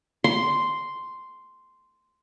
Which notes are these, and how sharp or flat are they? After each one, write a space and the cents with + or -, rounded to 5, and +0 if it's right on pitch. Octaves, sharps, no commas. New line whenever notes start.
C6 -5